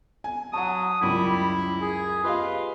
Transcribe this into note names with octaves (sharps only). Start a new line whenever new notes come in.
G#5
F#3 F#5 A5 D#6
C#2 F#2 G3 E4
G#4
F4 G4 B4 D#5 F5